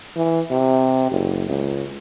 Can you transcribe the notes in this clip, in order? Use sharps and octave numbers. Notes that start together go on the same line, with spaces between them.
E3
C3
F#1
C#2